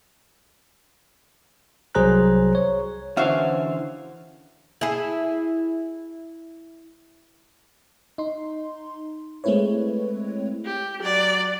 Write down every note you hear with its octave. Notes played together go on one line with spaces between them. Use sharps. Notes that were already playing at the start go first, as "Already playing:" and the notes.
C2 F#3 G#4 C5 A#5 F#6
C#5
D3 E3 C#4 F#4 C5 E5 F5
E4 G#4
D#4 C6
G#3 A3 C4 E4 B4 C#5
G4
F#3 D5